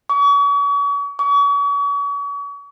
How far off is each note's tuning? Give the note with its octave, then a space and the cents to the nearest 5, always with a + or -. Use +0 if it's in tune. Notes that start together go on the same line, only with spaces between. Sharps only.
C#6 +40
C#6 +40